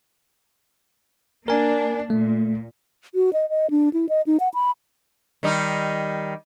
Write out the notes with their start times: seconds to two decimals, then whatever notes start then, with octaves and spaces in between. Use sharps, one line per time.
1.48 A#3 D4 A#4 G#5
2.10 A#2 A3
3.15 F#4
3.33 D#5
3.50 D#5
3.70 D4
3.93 E4
4.09 D#5
4.27 D#4
4.40 F#5
4.54 B5
5.43 D#3 G3 D#4